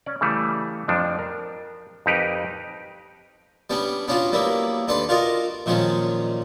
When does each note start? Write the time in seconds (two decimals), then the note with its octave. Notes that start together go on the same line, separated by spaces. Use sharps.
0.06 C#4 D5
0.21 C#3 E3 G3 A3
0.88 F2 F3 D4
1.19 A#4
2.06 F2 D#4 G4 A#4 B4
3.70 G3 B3 C#4 D4
4.08 B3 C#4 D4 F4 F#4
4.32 F#3 G3 A#3 B3 E4
4.88 D#2 D4 A4 B4 C6
5.09 F4 F#4 A#4 D5 D#5
5.66 A#2 D#3 F3 F#3 G#3 C#4